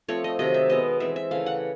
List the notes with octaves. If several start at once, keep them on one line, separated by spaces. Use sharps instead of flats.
F3 A3 C4 C#5
D#5
C3 D#3 F#3 D#5
E5
B2 G#3 B3 D#5
E3 G#3 C4 E5
E5
C#3 E3 A3 F5
F#5